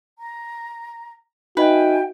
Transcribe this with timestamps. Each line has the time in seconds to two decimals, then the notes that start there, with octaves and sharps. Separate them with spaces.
0.18 A#5
1.57 D#4 F#4 B4 D#5 E5 G5 G#5